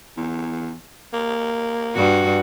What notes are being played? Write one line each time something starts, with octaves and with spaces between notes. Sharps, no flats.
E2
A#3
G2 F#4